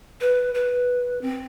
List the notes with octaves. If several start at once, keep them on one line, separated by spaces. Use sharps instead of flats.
B4
B4
C4